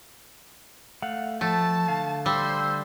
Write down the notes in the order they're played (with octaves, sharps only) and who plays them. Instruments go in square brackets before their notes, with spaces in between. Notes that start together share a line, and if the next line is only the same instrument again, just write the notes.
[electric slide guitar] A3 F5 F#5
[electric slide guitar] F3 [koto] A3 [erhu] A5
[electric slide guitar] D3 F5
[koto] G3 [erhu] C5 [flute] E6